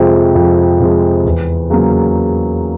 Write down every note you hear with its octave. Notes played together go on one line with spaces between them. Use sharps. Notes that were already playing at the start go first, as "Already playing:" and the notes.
Already playing: F2 C3 F3 G#3
F2
C3 F3 G#3
E2
C#3 F#3 A#3